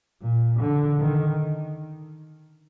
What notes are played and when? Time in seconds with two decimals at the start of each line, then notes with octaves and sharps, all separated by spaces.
0.21 A#2
0.60 D3
1.00 D#3